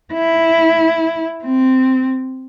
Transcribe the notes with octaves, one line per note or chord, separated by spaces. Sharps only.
E4
C4